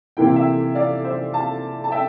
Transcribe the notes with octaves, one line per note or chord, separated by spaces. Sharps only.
C3 E3 A#3 E4 G5
F5
E5 G5
D5 F5
C5 E5
F5 A5
A5
E5 G5